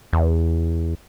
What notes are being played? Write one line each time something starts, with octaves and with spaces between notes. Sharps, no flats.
E2